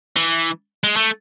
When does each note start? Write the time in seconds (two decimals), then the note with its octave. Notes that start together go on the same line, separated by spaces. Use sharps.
0.16 E3
0.83 G#3
0.96 A3